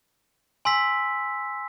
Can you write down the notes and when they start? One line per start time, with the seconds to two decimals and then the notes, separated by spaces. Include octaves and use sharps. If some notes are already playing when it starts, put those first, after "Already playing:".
0.65 G#5 C6 E6 B6